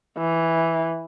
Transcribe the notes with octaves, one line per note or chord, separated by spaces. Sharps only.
E3